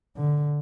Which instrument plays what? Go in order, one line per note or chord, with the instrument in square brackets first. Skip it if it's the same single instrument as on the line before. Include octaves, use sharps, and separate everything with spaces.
[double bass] D3